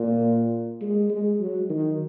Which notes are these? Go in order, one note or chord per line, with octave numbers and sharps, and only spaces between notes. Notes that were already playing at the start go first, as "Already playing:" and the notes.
Already playing: A#2
G#3
G#3
F#3
D#3